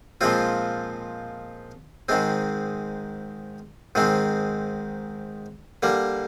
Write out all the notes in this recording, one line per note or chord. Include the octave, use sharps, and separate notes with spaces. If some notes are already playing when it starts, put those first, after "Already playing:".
A#2 F3 G#3 C4 F4
G#2 D#3 G#3 C4
G#2 D#3 G#3 C4
D3 G3 A#3